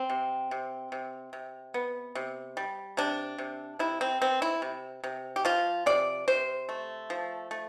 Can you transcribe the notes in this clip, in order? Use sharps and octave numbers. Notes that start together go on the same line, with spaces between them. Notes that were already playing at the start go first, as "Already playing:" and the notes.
Already playing: C4
C3
C3
C3
C3
B3
C3
G3
C3 D4
C3
C3 E4
C4
B3 C4
E4
C3
C3
G4
F3 F4
C3 D5
C3 C5
A3
F3
A3